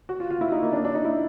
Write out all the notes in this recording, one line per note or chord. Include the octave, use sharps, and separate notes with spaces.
F#4
F4
F4
E4
D#4
A#3
D4
D4
D#4
E4